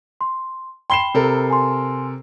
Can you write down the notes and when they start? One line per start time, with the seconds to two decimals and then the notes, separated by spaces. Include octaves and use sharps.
0.21 C6
0.90 G5 B5 C6 C7 E7 G7
1.14 C3 A4 A#4
1.50 G#5 C6